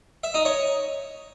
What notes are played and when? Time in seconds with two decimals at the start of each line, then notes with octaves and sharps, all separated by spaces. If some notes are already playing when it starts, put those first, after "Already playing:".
0.24 E5
0.34 D#4
0.45 C#5